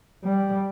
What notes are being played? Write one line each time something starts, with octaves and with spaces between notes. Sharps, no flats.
G3